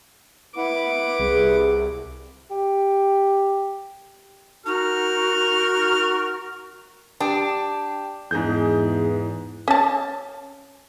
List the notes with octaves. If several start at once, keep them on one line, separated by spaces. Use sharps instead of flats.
E4 B4 F#5 D6
C2 G#4
G4
D#4 F#4 A#4 F6
D4 G4
E2 G#2 G#4 G6
C#4 A5